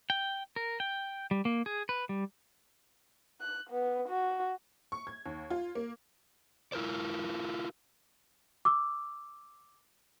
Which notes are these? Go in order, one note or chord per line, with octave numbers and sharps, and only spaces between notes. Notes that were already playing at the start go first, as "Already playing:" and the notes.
G5
A#4
G5
G3
A#3
G#4
B4
G3
F#6
B3
F#4
C#6
G#6
D#2
F4
A#3
E4 F4 A#4 C5 D5
D6 E6